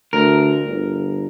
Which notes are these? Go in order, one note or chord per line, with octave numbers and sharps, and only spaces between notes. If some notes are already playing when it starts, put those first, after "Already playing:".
D2 A#4
G1